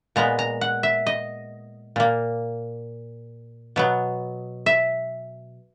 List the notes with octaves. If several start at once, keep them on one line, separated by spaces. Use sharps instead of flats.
A#2 G#3 B3 A#5
A#5
F#5
E5
D#5
A#2 A#3
B2 F#3 B3
E5